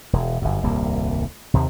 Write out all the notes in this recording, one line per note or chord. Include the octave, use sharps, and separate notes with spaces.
E1
G1 F#2
D#1 C2 G2 A#3
D#2 C3